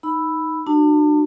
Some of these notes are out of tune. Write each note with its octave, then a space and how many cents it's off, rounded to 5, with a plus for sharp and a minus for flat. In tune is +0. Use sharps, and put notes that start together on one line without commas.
D#4 +0 B5 +0 E6 +0
D4 +35 F#4 +0 A5 +35